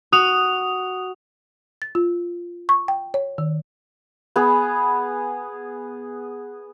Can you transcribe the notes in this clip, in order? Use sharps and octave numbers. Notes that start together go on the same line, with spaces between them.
F#4 D#6 F7
A6
F4
C#6
G5
C#5
D#3
B3 G#4